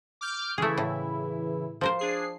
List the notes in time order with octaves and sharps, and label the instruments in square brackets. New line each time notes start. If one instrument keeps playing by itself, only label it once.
[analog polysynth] D6 F6 G6
[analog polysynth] C#3 E3 E4 [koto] A3 G#4
[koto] A2
F3 A#4 C5
[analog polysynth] D4 G#4 C7